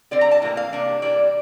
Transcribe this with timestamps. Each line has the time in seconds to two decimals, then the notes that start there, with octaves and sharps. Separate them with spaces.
0.11 D3 G3 C4 D5
0.21 A#5
0.31 A5
0.42 A2 E3 A#3
0.57 F5
0.73 C3 G3 A#3 D4
1.02 E3 G3 D4 D5